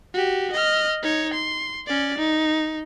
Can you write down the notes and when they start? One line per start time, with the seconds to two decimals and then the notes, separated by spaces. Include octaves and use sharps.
0.14 F#4 G4
0.52 D#5 F6
1.03 D#4 C#5
1.33 C6
1.87 C#4 D5
2.18 D#4